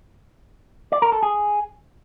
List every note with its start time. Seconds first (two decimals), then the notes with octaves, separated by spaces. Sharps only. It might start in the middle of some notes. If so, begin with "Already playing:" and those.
0.92 D5
1.02 A#4
1.12 A4
1.23 G#4